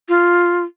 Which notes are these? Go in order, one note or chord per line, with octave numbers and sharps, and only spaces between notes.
F4